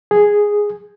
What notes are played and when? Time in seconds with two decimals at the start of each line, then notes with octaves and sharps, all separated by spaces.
0.11 G#4